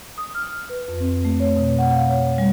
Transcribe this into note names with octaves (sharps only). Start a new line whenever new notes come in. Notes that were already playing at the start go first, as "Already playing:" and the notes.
D#6
F6
B4
F2
C4
A3
C#5
B2
F#5
F5
C#5
G3